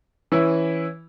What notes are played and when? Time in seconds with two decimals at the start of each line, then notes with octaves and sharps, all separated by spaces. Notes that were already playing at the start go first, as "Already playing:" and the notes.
0.32 E3 C#4 E4